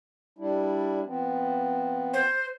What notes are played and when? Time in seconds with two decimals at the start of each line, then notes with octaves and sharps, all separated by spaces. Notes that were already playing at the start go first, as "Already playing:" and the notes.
0.39 G3 D4 E4
1.06 F3 B3 C4
2.14 C5